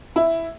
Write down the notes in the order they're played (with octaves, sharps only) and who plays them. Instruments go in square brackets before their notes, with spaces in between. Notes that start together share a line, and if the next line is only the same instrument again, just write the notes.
[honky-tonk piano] E4